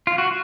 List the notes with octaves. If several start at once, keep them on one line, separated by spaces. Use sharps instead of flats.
F4
F#4